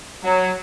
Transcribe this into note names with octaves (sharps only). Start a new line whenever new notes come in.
F#3